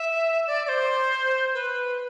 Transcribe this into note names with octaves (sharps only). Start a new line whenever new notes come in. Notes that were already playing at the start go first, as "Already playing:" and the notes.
Already playing: E5
D5
D5
C5
B4